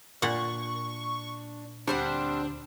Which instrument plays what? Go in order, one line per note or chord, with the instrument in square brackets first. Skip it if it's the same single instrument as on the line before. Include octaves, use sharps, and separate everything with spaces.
[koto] A#2 F#5 [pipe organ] D4 [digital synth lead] C#6
[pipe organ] D2 C5 [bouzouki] G3 C4 F#5 [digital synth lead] D4